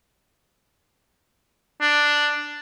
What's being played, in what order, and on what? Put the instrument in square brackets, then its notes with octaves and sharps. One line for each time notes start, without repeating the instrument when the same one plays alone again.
[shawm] D4